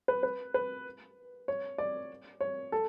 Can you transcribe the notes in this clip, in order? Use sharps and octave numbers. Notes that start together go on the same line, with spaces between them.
B4
B4
B4
C#5
D5
C#5
A4